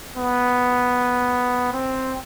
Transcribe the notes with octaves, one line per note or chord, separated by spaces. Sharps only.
B3
C4